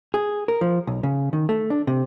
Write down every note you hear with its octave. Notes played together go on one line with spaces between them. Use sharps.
G#4
A#4
F3
B1
C#3
D#3
A3
D4
C3